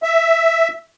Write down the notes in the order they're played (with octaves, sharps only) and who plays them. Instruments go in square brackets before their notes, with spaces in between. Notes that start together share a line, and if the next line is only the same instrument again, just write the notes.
[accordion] E5